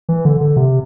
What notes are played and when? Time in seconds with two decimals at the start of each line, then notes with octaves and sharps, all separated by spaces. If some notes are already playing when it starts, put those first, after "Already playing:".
0.09 E3
0.25 D3
0.41 D3
0.57 C3